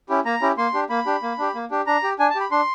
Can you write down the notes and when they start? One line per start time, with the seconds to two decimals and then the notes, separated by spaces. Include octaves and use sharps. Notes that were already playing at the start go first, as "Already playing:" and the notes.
0.09 C#4 E4 G4
0.25 A#3 A#5
0.41 C#4 E4 G4
0.57 A#3 C6
0.74 D4 G4
0.90 A#3 B5
1.06 D4 G4
1.23 A#3
1.38 D4 G4
1.55 A#3
1.71 D4 G4
1.87 D4 A#5
2.03 G4
2.19 D4 G#5
2.30 A5
2.35 G4
2.40 B5
2.51 D4 C6